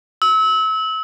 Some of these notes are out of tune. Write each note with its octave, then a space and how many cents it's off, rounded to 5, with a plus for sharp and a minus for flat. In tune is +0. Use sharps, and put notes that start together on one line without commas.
E6 -30